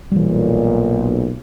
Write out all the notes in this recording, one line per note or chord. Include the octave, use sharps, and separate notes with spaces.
B1 A#2 E3 G3